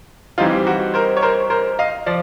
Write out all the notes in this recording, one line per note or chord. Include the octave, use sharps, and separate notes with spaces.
E3 G3 C4 D#4 F4
F#4
A#4 C5
C#5
A#4 C5
A#4 C5
D#5 F5
F3 D5